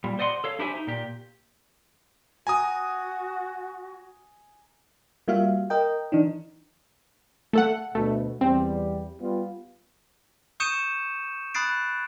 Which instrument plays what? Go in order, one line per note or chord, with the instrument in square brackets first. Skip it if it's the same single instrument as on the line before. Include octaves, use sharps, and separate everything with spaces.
[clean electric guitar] A#2 G3
C5 D5 D#5 F#5 C6
A4 C#5 F5
D4 E4 G4 C5 E5 G#5
D#4
A#2 G4
[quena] F#4 [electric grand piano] G#5 A#5 D#6
[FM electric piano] G3 A#3 F4 F#4 E5 F5
A#4 D#5 G5
E3 D4 D#4
[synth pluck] A3 A4 F#5
[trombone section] D2 B2 [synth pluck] A3
[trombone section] E2 G3 [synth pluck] C4
[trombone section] G3 B3 F4
[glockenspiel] C#6 D#6 G6 C#7 D#7 E7
B5 D#6 F#6 A6 C7 D7